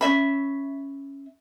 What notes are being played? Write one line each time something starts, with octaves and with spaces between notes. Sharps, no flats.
C#4 D#4 E5 B5